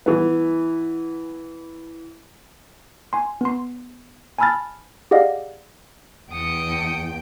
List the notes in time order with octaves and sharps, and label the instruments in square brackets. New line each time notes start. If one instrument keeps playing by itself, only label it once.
[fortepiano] E3 B3
[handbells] G#5 C6
B3 C6
G#5 A5 B5 E6 F6 A6
G4 G#4 D5 D#5 F5 F#5
[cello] E2 G5 [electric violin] D#6 C#7